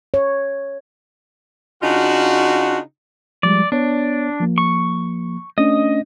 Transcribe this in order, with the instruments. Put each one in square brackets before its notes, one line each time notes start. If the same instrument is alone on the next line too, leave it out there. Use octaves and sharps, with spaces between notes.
[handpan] C#5
[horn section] C#3 D4 D#4 F4 F#4
[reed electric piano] F3 G3 G#3 [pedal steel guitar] D5
[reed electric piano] B3 C#5 [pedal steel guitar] D4
[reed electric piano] F3 A#3
[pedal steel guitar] C#6
[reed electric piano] A3 C#4 D4 [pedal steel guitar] D#5